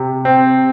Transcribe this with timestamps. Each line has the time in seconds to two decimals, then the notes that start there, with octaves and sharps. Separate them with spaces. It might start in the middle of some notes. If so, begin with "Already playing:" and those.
Already playing: C3
0.25 C4